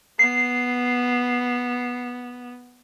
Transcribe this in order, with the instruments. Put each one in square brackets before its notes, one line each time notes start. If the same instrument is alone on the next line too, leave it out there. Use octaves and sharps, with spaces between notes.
[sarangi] B3 [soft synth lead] C7